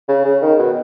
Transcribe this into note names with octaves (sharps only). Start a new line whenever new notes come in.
C#3
C#3
D#3
B2